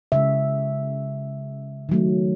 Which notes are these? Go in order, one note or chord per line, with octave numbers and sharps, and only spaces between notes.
C#3 G#3 E5
D#3 F#3 A3